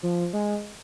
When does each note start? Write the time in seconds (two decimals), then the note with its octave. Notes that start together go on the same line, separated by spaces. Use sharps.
0.03 F3
0.33 G#3